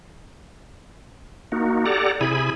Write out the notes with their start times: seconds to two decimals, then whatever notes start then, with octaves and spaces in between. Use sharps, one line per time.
1.52 A#3 D#4 F#4
1.85 G4 A4 D5 F#5 A#5
2.21 C3 E4 G#4 G#5 B5